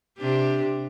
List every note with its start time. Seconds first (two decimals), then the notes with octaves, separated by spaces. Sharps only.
0.18 C3 D4 G4